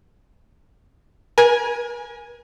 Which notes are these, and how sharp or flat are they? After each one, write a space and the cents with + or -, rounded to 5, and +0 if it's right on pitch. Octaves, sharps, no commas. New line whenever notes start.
A#4 +45 G#5 +0